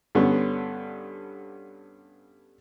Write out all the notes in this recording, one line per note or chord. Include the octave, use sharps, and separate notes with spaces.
G2 D3 B3 C#4